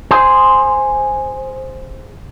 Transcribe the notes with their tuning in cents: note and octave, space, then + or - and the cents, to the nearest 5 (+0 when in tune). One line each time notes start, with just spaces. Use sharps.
G#4 +0 C5 +0